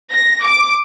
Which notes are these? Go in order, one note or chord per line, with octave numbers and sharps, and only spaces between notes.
A#6
D6